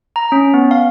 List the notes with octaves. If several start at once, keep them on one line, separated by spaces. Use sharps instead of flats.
A#5
C#4
B3
F5